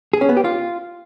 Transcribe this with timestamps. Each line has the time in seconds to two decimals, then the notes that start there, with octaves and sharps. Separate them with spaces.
0.13 G#4
0.21 C#4
0.29 B3
0.37 G4
0.44 F4